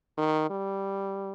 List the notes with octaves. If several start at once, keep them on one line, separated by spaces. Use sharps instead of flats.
D#3
G3